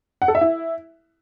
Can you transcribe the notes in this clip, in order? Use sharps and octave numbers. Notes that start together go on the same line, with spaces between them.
F#5
A4
E5
E4